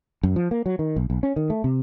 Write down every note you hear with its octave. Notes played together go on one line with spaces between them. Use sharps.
F#2
F3
A#3
F#3
D#3
B1
B1
C#4
D#3
A3
C3